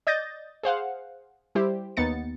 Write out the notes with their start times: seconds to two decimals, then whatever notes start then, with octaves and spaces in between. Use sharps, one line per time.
0.07 D5 D#5 D#6 G6 A6 A#6
0.63 G#4 C5 F5 F#5
1.55 G3 E4 G4 C5
1.97 D#2 B3 D#4 A6 C#7